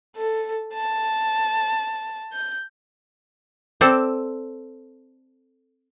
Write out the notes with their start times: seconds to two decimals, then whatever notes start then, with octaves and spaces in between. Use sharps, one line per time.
0.16 A4
0.74 A5
2.33 G6
3.81 C4 A4 D5